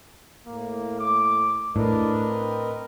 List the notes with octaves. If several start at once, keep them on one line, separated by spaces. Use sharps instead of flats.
A2 A#3
D6
A2 D4 A#4 B4 D#5
C4